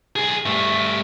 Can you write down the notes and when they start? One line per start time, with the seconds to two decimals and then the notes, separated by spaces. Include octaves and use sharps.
0.16 B1 G#4
0.46 G2 A3